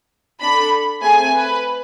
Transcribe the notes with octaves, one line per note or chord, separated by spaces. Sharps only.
D4 A4 B5
A3 C4 G#4 G#5
B4